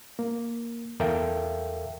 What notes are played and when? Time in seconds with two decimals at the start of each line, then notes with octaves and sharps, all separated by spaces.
0.19 A#3
1.00 E2 A4 A#4 E5 F5 G5